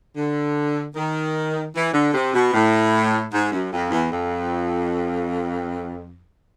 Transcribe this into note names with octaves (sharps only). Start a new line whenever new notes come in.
D3
D#3
E3
D3
C3
B2
A2
G#2
F#2
F2
E2
F2